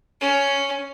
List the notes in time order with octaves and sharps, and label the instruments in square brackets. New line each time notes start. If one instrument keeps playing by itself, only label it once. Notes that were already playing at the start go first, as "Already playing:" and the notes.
[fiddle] C#4